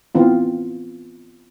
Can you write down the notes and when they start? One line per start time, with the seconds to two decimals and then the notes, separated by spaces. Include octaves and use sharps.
0.15 E3 B3 C4 F4